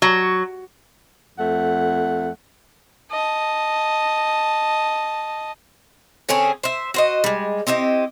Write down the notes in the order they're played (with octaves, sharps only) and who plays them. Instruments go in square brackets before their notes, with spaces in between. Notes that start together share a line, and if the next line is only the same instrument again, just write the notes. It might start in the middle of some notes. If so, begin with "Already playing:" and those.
[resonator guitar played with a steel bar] F#3
[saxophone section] F2 A3 F#5
[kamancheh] D#5 A5
[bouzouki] D3 C4 C#4 G#4
C5 E5
F#4 C5 D#5
G3 G#3
C4 E4 G4 D#5